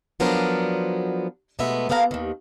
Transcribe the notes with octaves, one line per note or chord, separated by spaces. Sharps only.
F3 F#3 B3 D4 A#4 C5
B2 G#3 A3 B3 E5
A#3 B3 A4 F5 F#5 A#5
D#2 D#3